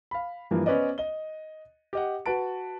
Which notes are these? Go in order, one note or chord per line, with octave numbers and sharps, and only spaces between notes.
F5 B5
G2 E3 F3 A#3
B3 C#4 B4 C5 D5 D#5
D#5 G7
G4 D#5 F#5
F#4 B4 A5 D7